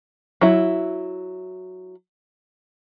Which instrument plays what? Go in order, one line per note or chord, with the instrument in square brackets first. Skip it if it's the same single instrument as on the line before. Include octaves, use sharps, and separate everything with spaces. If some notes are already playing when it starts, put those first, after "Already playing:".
[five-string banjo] F#3 E4